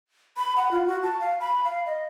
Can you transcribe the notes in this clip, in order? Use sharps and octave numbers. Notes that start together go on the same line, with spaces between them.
B5
F#5
F4
F#4
A5
F5
B5
F5
D#5